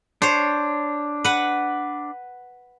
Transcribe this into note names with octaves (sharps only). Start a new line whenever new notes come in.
D4 C5 C#5
B4 F#5